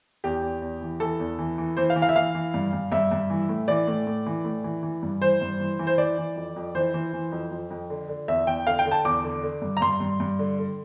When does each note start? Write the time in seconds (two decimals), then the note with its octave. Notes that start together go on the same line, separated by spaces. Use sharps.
0.24 E2 G4
0.42 E2
0.62 E2
0.81 E3
1.00 E3 A4
1.19 E2
1.39 E3
1.58 E3
1.77 E3 C5
1.90 F5
1.96 E3
2.02 F5
2.09 E5
2.15 E3 F5
2.35 E3
2.54 G2
2.73 G2
2.92 G2 E5
3.11 G2
3.30 E3
3.49 A2
3.68 E3 D5
3.88 A2
4.07 A2
4.26 E3
4.45 A2
4.64 E3
4.83 E3
5.03 G2
5.21 E3 C5
5.41 G2
5.60 E3
5.79 E3
5.87 C5
5.98 E3 D5
6.18 E3
6.36 F2
6.56 F2
6.75 E3 C5
6.94 E3
7.13 E3
7.32 F2
7.51 F2
7.70 F2
7.90 D3
8.09 D3
8.28 E2 E5
8.47 E2 G5
8.66 D3 F5
8.79 G5
8.86 D3
8.92 A5
9.05 E2 D6
9.24 D3
9.43 D3
9.62 G2
9.77 A#5
9.81 G2 C6
10.00 G2
10.20 G2
10.39 D3
10.59 D3